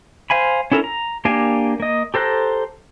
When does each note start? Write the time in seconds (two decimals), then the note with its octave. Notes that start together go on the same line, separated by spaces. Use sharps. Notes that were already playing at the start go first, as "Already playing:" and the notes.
0.30 C5 F5 G#5 B5
0.72 C#4 E4 A4 A#4
0.84 A#5
1.25 A#3 D4 G4 F5 G#5
1.80 A#3 D#5
2.14 G4 A4 C5 A#5 F#6